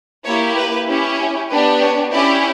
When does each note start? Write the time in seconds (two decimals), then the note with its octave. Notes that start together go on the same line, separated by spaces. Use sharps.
0.24 A#3 E4 G4 C#5
0.56 B4
0.87 C#4 E4 G4
1.49 B3 D4 G4 B4
1.81 C#5
2.12 C#4 E4 G4 D5